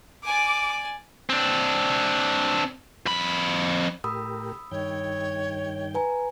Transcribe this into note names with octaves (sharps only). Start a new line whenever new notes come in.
D5 G#5 D6
C4 D4
F2 B5
A2 G4 A#4 B5 D#6 E6
G2 D#3 C#5 G5
B4 G#5 A#5